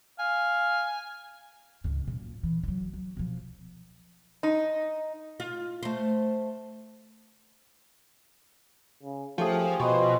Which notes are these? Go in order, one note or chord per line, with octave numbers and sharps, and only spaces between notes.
F5 G#5
C#2 G#2
F#2 A#2
E3
D#3 F#3
F#3
B2 F3
D#4
F4
A3 C5
C#3
F3 A3 C#4 G4 G#4
B2 F3 D#5 C6 C#6